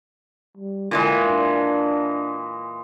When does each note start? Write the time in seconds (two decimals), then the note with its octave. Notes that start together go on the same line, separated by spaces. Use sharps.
0.57 G3
0.91 A#2 D3 E3 G#3
1.24 D4